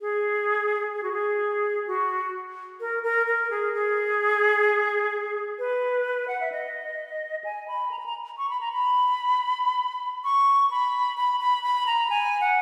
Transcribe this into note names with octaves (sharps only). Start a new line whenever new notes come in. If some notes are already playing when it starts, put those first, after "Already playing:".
G#4
G#4
F#4
G#4
F#4
A#4
A#4
A#4
G#4
G#4
B4
F#5
E5
D#5
G#5
B5
A#5
B5
A#5
C#6
B5
A#5
B5
C#6
B5
B5
B5
B5
A#5
G#5
F#5